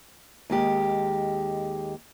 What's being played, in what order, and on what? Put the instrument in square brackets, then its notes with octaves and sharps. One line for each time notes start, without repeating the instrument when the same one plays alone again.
[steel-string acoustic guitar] D#2 G#3 G4